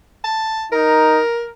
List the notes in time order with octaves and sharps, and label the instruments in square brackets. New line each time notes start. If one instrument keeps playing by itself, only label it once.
[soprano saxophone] A5
[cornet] D#4 [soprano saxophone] A#4